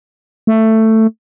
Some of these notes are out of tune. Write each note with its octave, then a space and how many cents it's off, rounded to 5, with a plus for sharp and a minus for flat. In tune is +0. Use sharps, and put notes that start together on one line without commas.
A3 +10